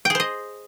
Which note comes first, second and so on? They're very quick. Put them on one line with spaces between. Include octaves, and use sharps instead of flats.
G5 G#4 C5 D#5